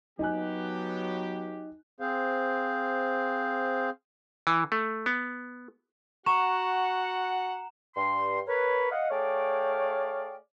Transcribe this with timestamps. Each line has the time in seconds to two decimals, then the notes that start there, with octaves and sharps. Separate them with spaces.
0.19 F#3 B3 D#4 G4 G#5 F#6
2.00 C4 G#4 C5 F5
4.47 E3
4.72 A3
5.06 B3
6.26 F#4 F#5 A#5 C#6 E7
7.95 G2 C6
8.47 A#4 B4 C#5
8.90 D#5 F5 F#5
9.10 A3 G#4 C#5 D5 F5 G5